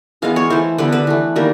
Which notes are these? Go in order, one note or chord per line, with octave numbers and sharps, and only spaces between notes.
E3 G#3 B3 F5
C#5
E3 A3 C5
D3 G3 B3 B4
B4
E3 A3
D#3 G3 A#3